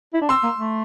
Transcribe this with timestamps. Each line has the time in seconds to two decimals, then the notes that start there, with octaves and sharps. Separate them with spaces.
0.14 E4
0.22 D4
0.29 C4 C6 E6
0.43 A#3
0.58 A3